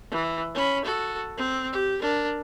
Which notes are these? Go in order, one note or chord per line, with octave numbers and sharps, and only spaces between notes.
E3
C#4 B5
F#4 A4
C4
G4
D4 A#4